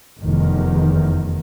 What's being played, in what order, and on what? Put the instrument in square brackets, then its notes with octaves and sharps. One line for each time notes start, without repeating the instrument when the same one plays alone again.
[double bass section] F1 E2 D#3